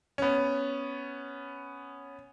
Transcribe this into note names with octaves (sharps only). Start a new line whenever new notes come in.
B3 C#4